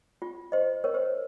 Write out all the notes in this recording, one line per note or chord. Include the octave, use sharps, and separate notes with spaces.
F4
C5 D#5
A#4 C#5
C5